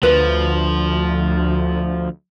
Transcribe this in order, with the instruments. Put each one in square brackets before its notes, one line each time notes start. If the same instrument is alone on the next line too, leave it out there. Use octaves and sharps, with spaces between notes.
[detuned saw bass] D2 [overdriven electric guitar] F3 [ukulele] B4